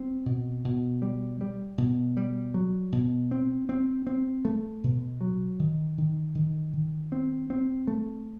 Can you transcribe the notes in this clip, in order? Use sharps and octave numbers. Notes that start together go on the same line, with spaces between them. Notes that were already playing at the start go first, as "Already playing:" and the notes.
Already playing: G3 C4
B2
B2
G3
G3
B2
G3
F#3
B2
C4
C4
C4
A3
B2
F#3
D#3
D#3
D#3
D#3
C4
C4
A3